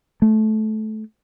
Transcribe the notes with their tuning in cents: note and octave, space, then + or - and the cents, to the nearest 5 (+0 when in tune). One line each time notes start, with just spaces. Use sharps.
A3 -20